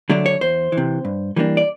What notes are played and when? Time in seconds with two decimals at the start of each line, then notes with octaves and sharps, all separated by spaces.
0.09 D3 F#3 A3 D4
0.26 C#5
0.41 E2 C5
0.72 E3
0.77 C3
1.05 G2
1.36 E3 G3 A#3 D4
1.57 D5